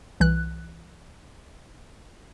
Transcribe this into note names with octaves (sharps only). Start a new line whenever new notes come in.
C2 E3 F#6